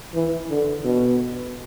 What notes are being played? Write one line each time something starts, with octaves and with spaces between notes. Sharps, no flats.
E3
D3
B2